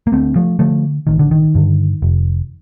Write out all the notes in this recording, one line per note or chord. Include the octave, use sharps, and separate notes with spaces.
A#3
D2 A3 C4
F3 A3
D3 F3 A3
A1 D#3
D3
D#3
G2 D3
F1